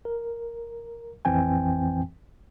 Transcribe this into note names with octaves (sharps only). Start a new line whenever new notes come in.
A#4
A1 F2 E3 C4 G5 G#5